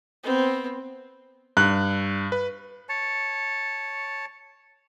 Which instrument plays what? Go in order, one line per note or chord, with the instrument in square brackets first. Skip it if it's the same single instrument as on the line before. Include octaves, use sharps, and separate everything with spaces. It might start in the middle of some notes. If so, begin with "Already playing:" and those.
[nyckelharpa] B3 C4
[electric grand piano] G2 [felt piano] F#6
[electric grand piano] B4
[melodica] C#5 A5